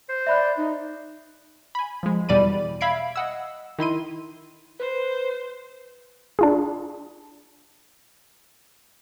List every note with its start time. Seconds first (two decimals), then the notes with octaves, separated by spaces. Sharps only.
0.09 C5
0.27 D5 E5 B5 F#6
0.57 D#4
1.75 G#5 B5
2.03 F3 G#3
2.29 E2 B2 G3 D5 B5 D#7
2.81 E5 F5 B5 G#6 C7 D7
3.16 D#5 F#5 E6
3.79 D#3 E4 C6 D#7
4.80 B4 C5
6.39 D4 F4 G#4